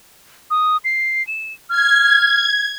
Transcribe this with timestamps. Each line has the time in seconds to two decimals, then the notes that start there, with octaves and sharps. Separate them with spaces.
0.51 D#6
0.85 C7
1.27 E7
1.70 F6 G#6